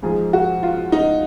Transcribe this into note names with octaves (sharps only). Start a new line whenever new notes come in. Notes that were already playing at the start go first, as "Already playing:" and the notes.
G#2 F3 G#3 G#4
F#4
F4
D#4